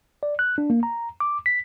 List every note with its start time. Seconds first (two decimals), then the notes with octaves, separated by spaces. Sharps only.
0.23 D5
0.39 F#6
0.58 D4
0.70 A#3
0.83 A#5
1.20 D6
1.46 B6